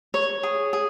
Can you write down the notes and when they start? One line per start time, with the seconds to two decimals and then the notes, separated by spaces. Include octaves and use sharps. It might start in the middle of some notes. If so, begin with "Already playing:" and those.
0.14 C#5
0.43 G#4
0.73 G#4